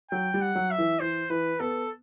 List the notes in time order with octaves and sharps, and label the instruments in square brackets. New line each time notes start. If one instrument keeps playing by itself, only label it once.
[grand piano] F#3 [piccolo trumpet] G5
[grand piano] G3
[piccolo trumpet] F#5
[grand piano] F#3
[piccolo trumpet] E5
[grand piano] E3
[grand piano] E3 [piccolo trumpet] C5
[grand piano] E3 [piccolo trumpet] B4
[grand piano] B3 [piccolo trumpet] A4